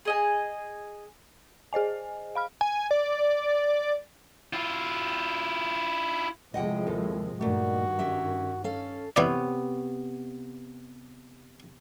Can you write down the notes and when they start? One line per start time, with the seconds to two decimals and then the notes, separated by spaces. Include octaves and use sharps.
0.05 G#4 D#5 G#5
1.73 G#4 C5 D#5 G#5
2.35 F5 B5 F6
2.61 G#5
2.91 D5
4.53 E4 F4
6.54 A2 C3 F3 G#3 D#5 F#5 G5
6.87 D#2 A4
7.41 G2 A#2 D#3 A3 F#4
7.99 C#4 G4 E5
8.64 C#4 A4 F5
9.16 C3 E3 B3 C#5 D5